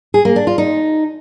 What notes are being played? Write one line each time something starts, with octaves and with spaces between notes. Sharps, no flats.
G#4
A#3
D4
F4
D#4